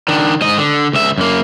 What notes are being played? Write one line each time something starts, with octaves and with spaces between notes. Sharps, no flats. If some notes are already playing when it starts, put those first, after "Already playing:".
D#3 D4
G#2 D#5
D3
C#2 E5
F#2 A#3